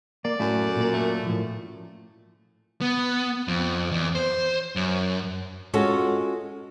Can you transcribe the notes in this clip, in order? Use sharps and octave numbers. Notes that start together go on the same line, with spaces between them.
A#3 D5
F#2 A2 A3
A#2 A#3
A3
A2 F3
B3
F2
E2
C5
F#2
G#3 C#4 F4 F#4 A4